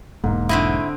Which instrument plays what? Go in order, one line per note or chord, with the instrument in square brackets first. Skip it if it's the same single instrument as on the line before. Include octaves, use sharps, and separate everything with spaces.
[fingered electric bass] E1 [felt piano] G#2 A#3
[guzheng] D3 C4 D#5 [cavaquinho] E4